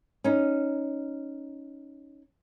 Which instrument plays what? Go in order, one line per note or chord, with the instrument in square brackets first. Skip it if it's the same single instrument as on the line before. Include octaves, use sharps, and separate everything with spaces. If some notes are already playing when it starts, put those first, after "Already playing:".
[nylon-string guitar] C#4 D#4